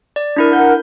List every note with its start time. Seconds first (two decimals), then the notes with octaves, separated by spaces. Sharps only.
0.16 D5
0.36 D4 E4 A#4
0.53 A#4 F#5 G6